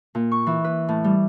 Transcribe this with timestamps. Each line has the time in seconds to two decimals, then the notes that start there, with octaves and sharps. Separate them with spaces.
0.15 A#2
0.32 C#6
0.47 E3
0.64 B4
0.88 A2
1.04 G3